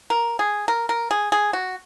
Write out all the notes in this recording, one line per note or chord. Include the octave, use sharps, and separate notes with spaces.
A#4
G#4
A#4
A#4
G#4
G#4
F#4